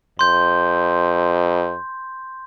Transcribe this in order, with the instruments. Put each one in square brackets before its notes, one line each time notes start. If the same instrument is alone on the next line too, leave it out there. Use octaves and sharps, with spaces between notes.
[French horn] F2 [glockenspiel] C6 G6